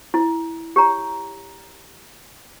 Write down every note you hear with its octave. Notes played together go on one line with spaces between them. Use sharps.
E4
G4 C#5 A#5